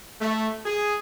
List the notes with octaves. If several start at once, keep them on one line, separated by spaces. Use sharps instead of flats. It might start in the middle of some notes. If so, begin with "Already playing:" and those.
A3
G#4